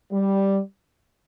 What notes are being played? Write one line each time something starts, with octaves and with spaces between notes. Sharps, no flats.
G3